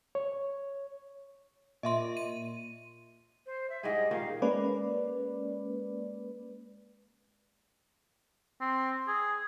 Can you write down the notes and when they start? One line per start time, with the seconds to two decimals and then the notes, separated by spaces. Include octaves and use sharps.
0.15 C#5
1.83 A#2 D#5 E5 C6
2.17 D#7
3.46 C5
3.69 E5
3.83 G#2 G3 G#4 D#5
4.11 A#2 D#3 F5
4.42 G#3 A#3 C#4 B4 D5
8.61 C4
9.08 G#4